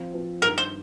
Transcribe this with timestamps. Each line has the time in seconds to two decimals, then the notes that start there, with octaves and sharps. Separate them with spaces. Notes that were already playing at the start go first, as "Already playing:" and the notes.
Already playing: F3 C4 F4
0.13 F3 C4 F4
0.42 G2 D#3 G3 A#4
0.58 C5